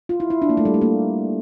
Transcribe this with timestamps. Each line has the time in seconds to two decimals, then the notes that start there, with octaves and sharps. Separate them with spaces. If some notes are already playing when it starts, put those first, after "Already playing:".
0.09 F4
0.20 E4
0.30 E4
0.42 D4
0.49 A#3
0.57 A3
0.65 G3
0.74 A3
0.81 A#3